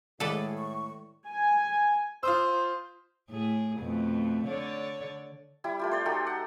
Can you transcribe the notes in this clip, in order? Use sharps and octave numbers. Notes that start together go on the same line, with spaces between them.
A2 D#3 G#3 G#4 A4 B4 D5 D#5
C#6
G#5
F4 C5 D#6 E6
A2 G#4
F2 B2 A3
D3 C#5 D5
G3 E4
A3 F4 G4
C5 D5 G5
D#4 F#4 G4 A4
F#5